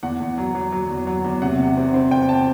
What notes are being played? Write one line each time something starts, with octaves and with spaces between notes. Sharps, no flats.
E2 F#5
E2
F#3
F#3
F#3
E2
F#3
E2
C3 F#5
C3
C4
C4
C4 G5
A5